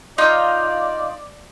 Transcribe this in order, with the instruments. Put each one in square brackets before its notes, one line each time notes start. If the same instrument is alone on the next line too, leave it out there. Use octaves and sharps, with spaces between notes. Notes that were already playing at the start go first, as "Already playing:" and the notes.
[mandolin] D#4 F4 D#5 [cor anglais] D5